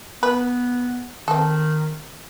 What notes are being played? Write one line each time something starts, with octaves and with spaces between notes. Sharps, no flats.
B3 B4
D#3 C4 A4